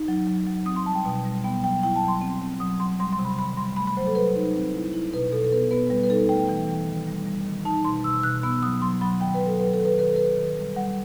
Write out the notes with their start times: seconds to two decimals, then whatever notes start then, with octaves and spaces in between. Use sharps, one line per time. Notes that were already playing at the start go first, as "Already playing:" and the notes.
Already playing: D#4
0.08 F#3
0.27 F#3
0.47 F#3
0.66 C4 D#6
0.76 C6
0.86 G3 A5
0.95 G5
1.05 B2
1.25 G3
1.44 B3 G5
1.63 F#3 G5
1.83 E4 G5
1.96 A5
2.02 F#3
2.08 C6
2.22 C4
2.42 C4
2.60 F#3 D#6
2.80 F#3 C6
3.00 G3 C6
3.12 C6
3.19 C3
3.25 B5
3.38 D#3 B5
3.57 G3 C6
3.76 A3 B5
3.87 B5
3.97 F#3 C5
4.07 A4
4.15 F#3 B4
4.36 D#4
4.55 C4
4.74 E4
4.93 E4
5.13 B2 B4
5.32 B2 A4
5.44 A4
5.52 B3 B4
5.71 B3 B4
5.90 G3 B4
6.03 B4
6.10 D#4 A4
6.29 A3 G5
6.49 E3 G5
6.68 E3
6.87 D#3
7.07 G3
7.27 G3
7.47 D#3
7.65 D#4 A5
7.85 B2 C6
8.04 B2 E6
8.23 B2 F#6
8.43 B3 E6
8.62 F#3 D#6
8.81 F#3 C6
9.01 F#3 B5
9.21 D#3 G5
9.34 B4
9.40 F#3
9.46 A4
9.60 F#3 B4
9.73 A4
9.79 D#3
9.85 B4
9.99 D#3 B4
10.07 A4
10.16 D#3 B4
10.37 D#3
10.57 G3
10.76 G3 F#5